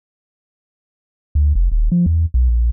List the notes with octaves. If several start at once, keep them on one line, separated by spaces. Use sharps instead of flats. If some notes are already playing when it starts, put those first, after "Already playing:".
D2
F1
D#1
F3
E2
B1
A#1